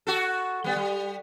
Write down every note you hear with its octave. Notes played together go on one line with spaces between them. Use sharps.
F#4 A4
G3 B3
G3